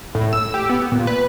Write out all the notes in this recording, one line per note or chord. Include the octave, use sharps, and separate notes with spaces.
A2
E6
G4
B3
A#2
B4